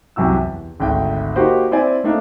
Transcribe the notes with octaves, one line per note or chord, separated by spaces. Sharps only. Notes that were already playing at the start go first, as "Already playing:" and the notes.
C2 F#2 C3 F#4 E6
E2
G#1 D2 G5
A#3 D#4 F#4 G4 C5
C4 E4 C5 D5 G#5
A3 A#3 C4 D4 D#4 A#4